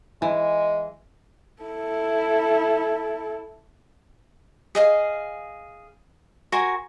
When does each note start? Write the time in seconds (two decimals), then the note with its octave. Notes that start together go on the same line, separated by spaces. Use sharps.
0.22 E3 G#3
1.63 E4 A4
4.75 G#4 D#5 F5
6.52 F#4 A#4 G#5 C6